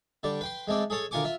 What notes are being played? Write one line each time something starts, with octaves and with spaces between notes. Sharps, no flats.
D3 G3 D5
B4 G5 C6
G#3 A3 C4 D5
G#4 A4 C#5 A5
D2 F4 A#4 G#5 C#6 D6
F4 E5